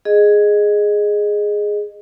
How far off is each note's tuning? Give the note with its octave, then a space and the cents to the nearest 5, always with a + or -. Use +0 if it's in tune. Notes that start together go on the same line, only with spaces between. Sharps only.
G#4 +0 D#5 -15